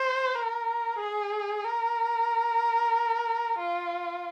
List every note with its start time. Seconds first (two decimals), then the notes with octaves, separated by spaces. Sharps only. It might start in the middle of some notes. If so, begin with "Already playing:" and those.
Already playing: C5
0.35 A#4
0.99 G#4
1.65 A#4
3.59 F4